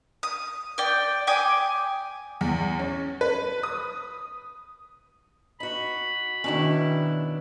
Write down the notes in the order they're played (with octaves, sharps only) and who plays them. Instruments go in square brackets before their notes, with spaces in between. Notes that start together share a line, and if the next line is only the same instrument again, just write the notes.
[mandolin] D#6
D5 G5
G5 G#5 D6 D#6
[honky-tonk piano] E2
C#4
B4
D#6
[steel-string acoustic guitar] D#4 F#4 [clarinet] B5
[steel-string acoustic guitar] B2 D4 E4 [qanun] D#3 C#4